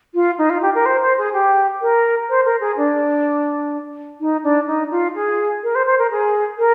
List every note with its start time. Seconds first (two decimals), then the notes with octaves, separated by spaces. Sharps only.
0.14 F4
0.38 D#4
0.50 F4
0.62 G4
0.74 A#4
0.86 C5
1.02 C5
1.18 G#4
1.33 G4
1.82 A#4
2.29 C5
2.45 A#4
2.60 G#4
2.77 D4
4.20 D#4
4.43 D4
4.67 D#4
4.91 F4
5.15 G#4
5.63 A#4
5.75 C5
5.86 C5
5.99 A#4
6.11 G#4
6.58 A#4